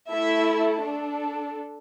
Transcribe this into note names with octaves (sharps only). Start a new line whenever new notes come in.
A3 E4 A4 E5
D4
A4